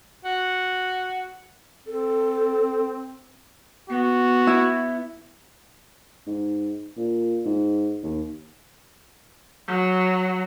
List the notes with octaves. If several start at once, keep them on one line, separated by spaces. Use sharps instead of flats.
F#4
C4 A4
B3 F#4
E4
G#2
A#2
G#2
D#2
F#3